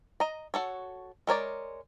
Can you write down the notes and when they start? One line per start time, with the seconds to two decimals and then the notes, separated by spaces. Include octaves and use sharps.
0.20 D#5 A#5
0.54 F#4 A4 C#5
1.27 G#3 A#4 C#5 D5